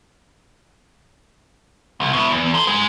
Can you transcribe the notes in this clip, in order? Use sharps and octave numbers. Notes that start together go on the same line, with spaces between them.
C2
B2 E4
E2
A4 C5
G#2 G#3